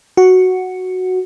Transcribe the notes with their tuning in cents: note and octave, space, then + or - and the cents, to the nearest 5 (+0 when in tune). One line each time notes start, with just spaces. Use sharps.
F#4 +0